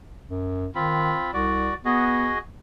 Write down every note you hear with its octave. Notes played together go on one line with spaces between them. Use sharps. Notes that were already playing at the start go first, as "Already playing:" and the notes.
F#2
D#3 C4 F4 B5
C2 F#4 D5
B3 F#4 G#4 D#5